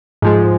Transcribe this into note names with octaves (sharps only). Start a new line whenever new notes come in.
G#2 F3 G#3